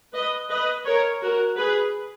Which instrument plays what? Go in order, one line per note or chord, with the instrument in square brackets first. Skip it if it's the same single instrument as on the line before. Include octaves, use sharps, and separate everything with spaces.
[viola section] B4 D#5
B4 D#5
A#4 C#5
F#4 A#4
G#4 B4